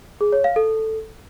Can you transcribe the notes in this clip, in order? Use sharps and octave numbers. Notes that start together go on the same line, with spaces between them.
G#4
C#5
F5
A4